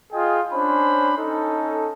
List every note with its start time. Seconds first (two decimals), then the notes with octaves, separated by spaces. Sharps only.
0.13 F4 G#4 D#5 G5
0.53 C#4 D4 C5 B5
1.18 C#4 D#4 A4